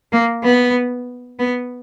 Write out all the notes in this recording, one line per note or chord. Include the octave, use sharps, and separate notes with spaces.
A#3
B3
B3